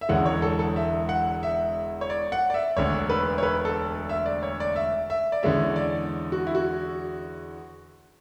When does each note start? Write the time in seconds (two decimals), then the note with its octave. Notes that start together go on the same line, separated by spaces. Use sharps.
0.01 E5
0.09 E1 E2 D3 G#3 C#4 F#5
0.26 C#5
0.42 A4
0.59 A4
0.76 E5
1.09 F#5
1.43 E5
2.01 C#5
2.10 D5
2.32 F#5
2.50 D5
2.54 E5
2.77 E1 D2 D3 C#5
3.10 B4
3.38 C#5
3.43 B4
3.65 A4
4.09 E5
4.26 D5
4.43 C#5
4.60 D5
4.76 E5
5.10 E5
5.32 D5
5.43 E2 D3 G#3 C#4 E5
5.76 D5
6.32 F#4
6.47 E4
6.55 F#4